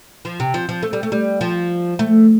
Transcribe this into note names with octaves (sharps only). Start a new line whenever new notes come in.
F3
C3
F3
F3
A3
G3
A3
G3
F3
A3